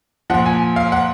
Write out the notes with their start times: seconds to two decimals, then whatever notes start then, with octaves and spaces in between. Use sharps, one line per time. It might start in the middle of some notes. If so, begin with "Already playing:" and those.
0.30 A#2 F3 F#5
0.46 G#5
0.76 F5
0.92 F#5